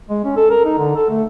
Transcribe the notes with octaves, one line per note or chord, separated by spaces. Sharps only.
G#3
C#4
A4
A#4
D#4
D3
A4
A3